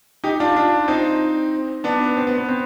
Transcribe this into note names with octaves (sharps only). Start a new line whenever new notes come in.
D#4 G4
D4 F4
D4 F4
C4 D#4
B3 D4
C4
B3
B3
C4